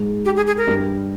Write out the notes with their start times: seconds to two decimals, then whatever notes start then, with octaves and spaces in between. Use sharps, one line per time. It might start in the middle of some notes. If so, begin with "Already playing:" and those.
Already playing: G#2 G#3
0.25 G4
0.36 G#4
0.47 G#4
0.58 A#4
0.67 G2 G3